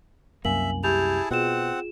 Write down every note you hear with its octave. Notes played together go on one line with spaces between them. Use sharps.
C2 F#2 A#3 E5 G#5 F#7
E4 G4 G#4 A5 G6 F7
B2 C4 F4 G#4 F#5 E7